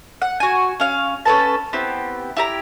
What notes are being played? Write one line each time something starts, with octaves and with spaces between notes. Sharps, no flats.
F#5
F#4 G#5
C#4 F5
C#4 A4 B4 A5
B3 C4 E4 G4
E4 G4 A#5